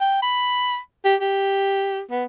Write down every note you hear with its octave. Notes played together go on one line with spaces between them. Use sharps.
G5
B5
G4
G4
B3